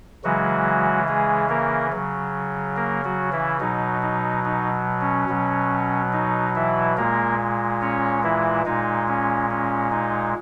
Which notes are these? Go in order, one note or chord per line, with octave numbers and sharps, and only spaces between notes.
C#3 E3 F#3 G#3 F#4
G#3 G#4
A#3 A#4
C#3 F#3
A#3 A#4
F#3 F#4
E3 E4
B2 F#3 D#4
D#4
D#4
C#4
B2 F#3
D#4
E3 E4
A#2 G#3 A#3 A#4
C#4 C#5
E3 E4
A#2 G#3 D#4
C#4
C#4
D#4